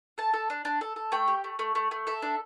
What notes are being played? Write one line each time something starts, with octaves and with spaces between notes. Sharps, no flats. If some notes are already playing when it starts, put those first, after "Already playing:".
A4 A5
A4
D4
D4
A4
A4
A3 G5
G4
A3
A3
A3
A3
A4 E5
D4